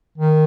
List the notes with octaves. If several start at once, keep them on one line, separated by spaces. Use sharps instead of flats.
D#3